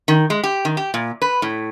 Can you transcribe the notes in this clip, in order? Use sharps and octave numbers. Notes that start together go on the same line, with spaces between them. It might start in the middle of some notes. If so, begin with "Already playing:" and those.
D#3
G#3
G4
D#3
G4
A#2
B4
A2